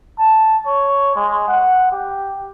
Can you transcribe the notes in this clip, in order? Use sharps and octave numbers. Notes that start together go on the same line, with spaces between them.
A5
C#5
G#3
F#5
G4